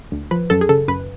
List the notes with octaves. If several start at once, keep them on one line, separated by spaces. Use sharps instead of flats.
D2
F3 B4
F#2 A4
G#4
C#3 A4
F#2 B4